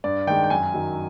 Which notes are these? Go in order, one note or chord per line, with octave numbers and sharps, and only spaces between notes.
G2 D5
D#3 G#3 G5
G5
F#2 G#5
D#3 F#3